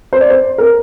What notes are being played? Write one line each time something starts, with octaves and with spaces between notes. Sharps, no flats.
C5
D5
C5
A#4